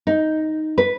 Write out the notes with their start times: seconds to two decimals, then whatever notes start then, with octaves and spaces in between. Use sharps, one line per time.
0.07 D#4
0.78 B4